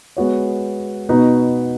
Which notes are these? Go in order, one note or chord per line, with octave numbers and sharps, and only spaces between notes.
G#3 B3 F#4 C#5
B2 B3 D#4 F#4 B4